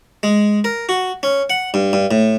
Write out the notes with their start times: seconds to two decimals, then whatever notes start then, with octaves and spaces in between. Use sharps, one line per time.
0.23 G#3
0.64 A#4
0.89 F#4
1.23 C#4
1.50 F#5
1.74 G2
1.93 G2
2.11 A2